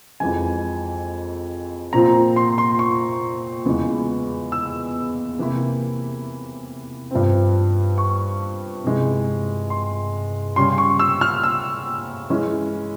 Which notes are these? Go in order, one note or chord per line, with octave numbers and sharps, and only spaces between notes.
F2 E3 G#3 G#5
A#2 F3 C4 F4 A#5
C6
C6
C#6
E2 C#3 E3 G#3
E6
C3 E3 A#3 E4
G2 F3 C4
C#6
C3 E3 G#3 E4
C6
C#3 G3 C#4 C6
C#6
E6
F6
E6
E3 G#3 C#4 E4